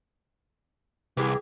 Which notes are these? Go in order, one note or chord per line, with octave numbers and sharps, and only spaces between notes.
C2 E3 G4 G#4